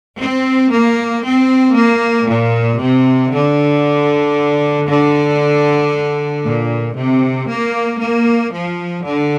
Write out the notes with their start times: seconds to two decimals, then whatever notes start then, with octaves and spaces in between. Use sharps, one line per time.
0.18 C4
0.71 A#3
1.23 C4
1.75 A#3
2.26 A#2
2.79 C3
3.31 D3
4.87 D3
6.44 A#2
6.95 C3
7.47 A#3
8.00 A#3
8.52 F3
9.04 D3